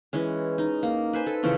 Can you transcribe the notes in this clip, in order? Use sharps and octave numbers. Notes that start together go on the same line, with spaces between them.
E3 G#3 C#4
D#4
A#3
B4 C5 G#5
A4
C#3 E3 F3 C#4